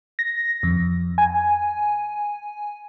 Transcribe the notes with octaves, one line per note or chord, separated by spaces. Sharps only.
A#6
F2
G#5